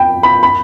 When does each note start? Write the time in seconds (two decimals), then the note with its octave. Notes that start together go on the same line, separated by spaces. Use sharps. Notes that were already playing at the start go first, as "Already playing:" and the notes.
Already playing: G5 B5
0.23 B5
0.43 B5